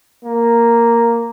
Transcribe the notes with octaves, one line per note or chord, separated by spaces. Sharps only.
A#3